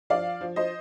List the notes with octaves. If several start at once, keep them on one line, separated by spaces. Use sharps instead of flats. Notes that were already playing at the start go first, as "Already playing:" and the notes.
F3 D5 F5
F3
C5 D#5